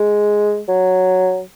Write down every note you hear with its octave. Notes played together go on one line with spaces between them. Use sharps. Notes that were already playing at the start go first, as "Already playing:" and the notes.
Already playing: G#3
F#3